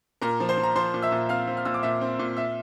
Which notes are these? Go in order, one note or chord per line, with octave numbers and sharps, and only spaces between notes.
A#2 A#4 A#5
F3
C5 C6
F3
A#5
F3 C5 C6
A#2
E5 E6
A#2
C4 F5 F6
C4
F6
A#2 E6
D6
A#2 E5 E6
C4
A#2
E5 E6